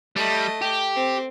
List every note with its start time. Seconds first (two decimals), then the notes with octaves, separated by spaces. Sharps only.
0.16 G3 A3 D#5
0.62 G4
0.96 C4